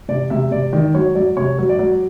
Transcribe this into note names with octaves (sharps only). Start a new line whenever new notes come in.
C3 D5
C3 E5
C3 D5
D#3 D5
F#3 C#5
F#3 D5
C3 C#5
F#3
D5
F#3